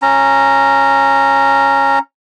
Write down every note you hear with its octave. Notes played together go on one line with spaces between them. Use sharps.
C#4 A#5